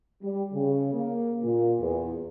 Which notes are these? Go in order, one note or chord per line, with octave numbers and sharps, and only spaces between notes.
G3
C#3
A#3
A#2
E2